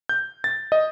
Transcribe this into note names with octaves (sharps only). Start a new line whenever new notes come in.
G6
A6
D#5